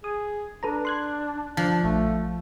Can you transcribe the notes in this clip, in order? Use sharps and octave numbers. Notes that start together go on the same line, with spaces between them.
G#4 D#6
D4 A4 B4 A#5
C6 F#6 G#6
F3 D4 A5
A#1 A3